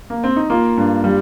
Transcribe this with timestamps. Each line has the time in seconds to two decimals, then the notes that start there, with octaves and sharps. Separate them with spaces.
0.10 A#3
0.24 C4
0.37 D#4
0.50 A#3 F4
0.77 G2
1.04 G3